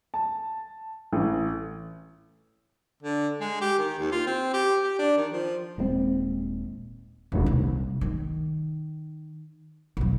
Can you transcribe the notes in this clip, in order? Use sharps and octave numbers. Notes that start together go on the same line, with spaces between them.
A5
A1
D3
G#3
G4
D#3
D#2
F4
C4
G4
G4
D4
D#3
F3
D#1 G2 G#3 C4
D#1
C2
D#3
B1 E2